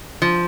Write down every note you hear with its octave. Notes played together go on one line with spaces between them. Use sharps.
F3